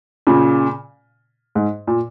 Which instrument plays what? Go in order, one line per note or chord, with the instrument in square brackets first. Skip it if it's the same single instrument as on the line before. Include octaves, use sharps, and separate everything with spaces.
[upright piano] A#2 C#3
G#2
A#2